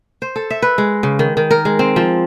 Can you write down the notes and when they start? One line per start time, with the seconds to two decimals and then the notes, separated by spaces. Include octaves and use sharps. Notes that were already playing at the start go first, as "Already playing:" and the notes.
0.22 C5
0.36 A4
0.50 E5
0.62 B4
0.78 G#3
1.03 C#3
1.19 D#3
1.37 D#3
1.51 A#4
1.65 G#3
1.79 C4
1.96 F3